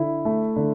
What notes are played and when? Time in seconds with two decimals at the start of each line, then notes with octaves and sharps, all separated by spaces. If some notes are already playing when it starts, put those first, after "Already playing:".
Already playing: D3 E4
0.25 A3
0.56 D3